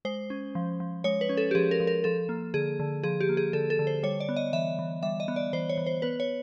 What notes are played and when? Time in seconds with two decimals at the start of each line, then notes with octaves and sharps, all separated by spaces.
0.05 G#3 C5
0.30 C#4
0.55 F3
0.80 F3
1.04 G#3 C#5
1.21 B4
1.29 C#4
1.37 A4
1.51 G4
1.55 F3 G#4
1.71 A#4
1.80 F3
1.87 A#4
2.04 F3 A4
2.29 A#3
2.54 D3 G#4
2.80 D3
3.03 F3 G#4
3.21 G4
3.29 A#3
3.37 G#4
3.53 D3 A4
3.70 A4
3.79 D3
3.87 C5
4.03 G3 C#5
4.20 D5
4.29 B3
4.37 D#5
4.53 E3 E5
4.79 E3
5.03 G3 E5
5.20 D#5
5.28 B3
5.36 D5
5.53 E3 C5
5.69 C#5
5.77 E3
5.86 C5
6.02 B3 B4
6.20 C#5